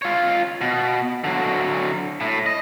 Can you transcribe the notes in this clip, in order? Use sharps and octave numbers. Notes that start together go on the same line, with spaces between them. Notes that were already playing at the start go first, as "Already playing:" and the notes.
F4 C#5
B2
D3 F#3
A2
D#5